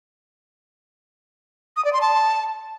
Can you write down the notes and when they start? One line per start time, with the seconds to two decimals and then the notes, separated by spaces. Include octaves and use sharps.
1.77 D#6
1.85 D5
1.93 C6
2.01 A5